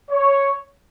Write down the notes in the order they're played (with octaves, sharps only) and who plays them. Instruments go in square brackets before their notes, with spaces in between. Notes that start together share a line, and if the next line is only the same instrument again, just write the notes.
[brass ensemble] C#5